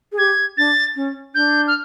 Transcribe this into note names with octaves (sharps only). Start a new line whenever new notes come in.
G#4
G4 G#6
D4 A6
C#4
D4 G6
F6